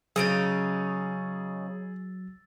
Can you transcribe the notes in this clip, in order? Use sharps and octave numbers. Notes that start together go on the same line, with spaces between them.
C#3 F#3 C#4 D#4 G#4 E6 A6 D7